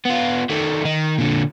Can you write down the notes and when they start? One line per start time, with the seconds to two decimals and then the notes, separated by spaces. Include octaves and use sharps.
0.06 B3 F4
0.50 D#3 A3
0.85 D#3 D#4
1.18 A#2 D3